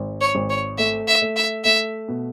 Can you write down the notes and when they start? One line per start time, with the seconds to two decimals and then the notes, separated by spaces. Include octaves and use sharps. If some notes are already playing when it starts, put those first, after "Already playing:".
Already playing: G#1
0.21 C#5
0.35 G#1
0.50 C#5
0.78 A3 E5
1.08 E5
1.22 A3
1.36 E5
1.64 A3 E5
2.08 B2